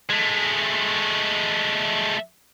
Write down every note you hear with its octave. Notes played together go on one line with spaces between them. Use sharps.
G#3 A3